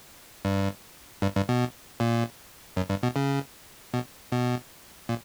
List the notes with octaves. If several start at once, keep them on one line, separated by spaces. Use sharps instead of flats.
G2
G2
G2
B2
A#2
F#2
G2
B2
C#3
B2
B2
A#2